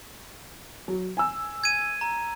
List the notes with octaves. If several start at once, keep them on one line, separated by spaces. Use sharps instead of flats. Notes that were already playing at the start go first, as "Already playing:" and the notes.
F#3
G#5 E6
G#6 D#7
A#5